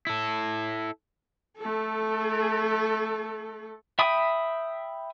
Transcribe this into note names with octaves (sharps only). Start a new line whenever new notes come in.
E4 A4
A3 A4
E5 G5 B5 D#6